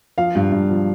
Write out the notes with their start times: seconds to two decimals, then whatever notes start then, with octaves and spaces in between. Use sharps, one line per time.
0.18 F3 F5
0.35 G2
0.52 G2
0.70 F3